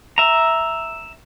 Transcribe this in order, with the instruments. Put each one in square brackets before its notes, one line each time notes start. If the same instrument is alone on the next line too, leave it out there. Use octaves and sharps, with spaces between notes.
[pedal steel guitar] E5 A#5